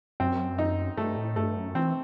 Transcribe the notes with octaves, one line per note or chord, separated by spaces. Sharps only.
F#2 C4
D#4
G2 A3
A2
G2 A3
F#2
E3 C4